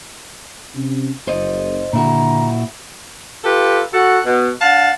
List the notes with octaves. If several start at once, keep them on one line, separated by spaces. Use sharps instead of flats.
C3 C#4
F#1 C5 D#5
A#2 D3 E4 F#4 A#5
F4 G4 A4 B4
F#4 A4 F#5
B2
D4 F5 F#5 A5